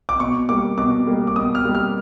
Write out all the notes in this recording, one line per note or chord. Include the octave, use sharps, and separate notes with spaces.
D6
B2 C#6
G3 A#3 D6
B2 D6
G3 A#3
D6
B2 D#6
F6
G3 A#3
F6